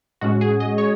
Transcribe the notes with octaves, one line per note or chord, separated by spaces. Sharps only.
A2 G#3 C#4 F#4
G#4
D#5
C#5